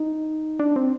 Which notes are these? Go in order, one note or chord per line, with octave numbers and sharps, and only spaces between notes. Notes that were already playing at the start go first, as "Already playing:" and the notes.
Already playing: D#4
D4
C4